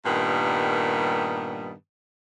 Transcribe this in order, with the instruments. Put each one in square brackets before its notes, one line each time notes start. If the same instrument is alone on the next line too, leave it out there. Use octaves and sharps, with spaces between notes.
[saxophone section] G2 A#2 D#3 G3 B3